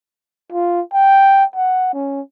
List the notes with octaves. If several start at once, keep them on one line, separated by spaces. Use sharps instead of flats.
F4
G5
F#5
C#4